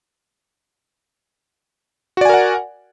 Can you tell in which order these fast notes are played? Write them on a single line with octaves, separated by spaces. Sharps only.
F#4 D5 G#5 A#4 F#5